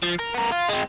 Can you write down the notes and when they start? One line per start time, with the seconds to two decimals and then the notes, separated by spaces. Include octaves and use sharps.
0.03 F3
0.19 A#4
0.35 B3 A#4
0.52 F4
0.69 G#3 C4